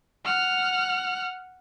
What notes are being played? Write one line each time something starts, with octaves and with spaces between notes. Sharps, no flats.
F#5 F6